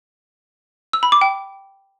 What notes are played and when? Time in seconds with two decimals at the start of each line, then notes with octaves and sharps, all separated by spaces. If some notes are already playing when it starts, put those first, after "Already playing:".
0.93 E6
1.03 B5
1.12 D6
1.21 G5